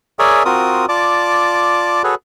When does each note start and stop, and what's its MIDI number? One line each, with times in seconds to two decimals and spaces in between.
0.19 0.43 68
0.19 0.43 70
0.19 0.43 73
0.19 0.43 74
0.19 0.43 76
0.19 0.43 80
0.45 0.86 60
0.45 0.86 65
0.45 0.86 66
0.45 0.86 70
0.45 0.86 87
0.89 2.02 65
0.89 2.02 74
0.89 2.02 81
0.89 2.02 86
2.04 2.15 66
2.04 2.15 68
2.04 2.15 69
2.04 2.15 71
2.04 2.15 73